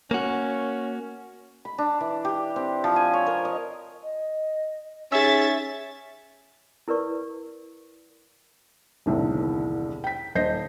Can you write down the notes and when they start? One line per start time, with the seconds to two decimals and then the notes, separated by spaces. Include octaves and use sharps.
0.11 A#3 C#4 F#4
1.65 B5
1.78 D4
2.01 E3
2.25 G4
2.56 C4
2.84 F3
2.96 G#5
3.14 C#5
3.26 A#4
3.45 D#5
4.03 D#5
5.12 C#4 D#4 G#4 E5 E6 A6
6.88 E4 A#4 B4 D5 C#6
9.06 E1 C2 A2 D3 D#3
10.04 G5 B6
10.35 D#1 C5 D#5 G6 A#6 C7